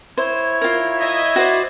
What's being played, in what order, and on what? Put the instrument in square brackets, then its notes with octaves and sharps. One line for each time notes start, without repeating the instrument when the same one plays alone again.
[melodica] E4 C#5 [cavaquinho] C5
[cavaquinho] F4 A#4
[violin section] D#5 E5
[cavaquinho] F#4 C5 D5